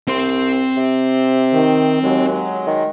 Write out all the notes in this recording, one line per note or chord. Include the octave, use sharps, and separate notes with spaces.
C2 C4 C6
C3
D#3
D#2 F#3 G#3
D#3